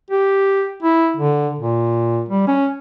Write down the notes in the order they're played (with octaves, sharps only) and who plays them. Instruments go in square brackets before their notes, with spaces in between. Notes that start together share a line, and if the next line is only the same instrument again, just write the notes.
[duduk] G4
E4
D3
A#2
G3
C#4